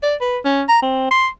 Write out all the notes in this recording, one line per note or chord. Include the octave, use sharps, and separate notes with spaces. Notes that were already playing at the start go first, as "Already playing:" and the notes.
D5
B4
C#4
A#5
C4
C6